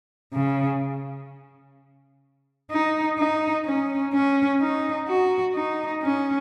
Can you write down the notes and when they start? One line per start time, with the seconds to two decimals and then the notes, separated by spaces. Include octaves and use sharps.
0.33 C#3
2.71 D#4
3.18 D#4
3.66 C#4
4.13 C#4
4.60 D#4
5.08 F#4
5.55 D#4
6.03 C#4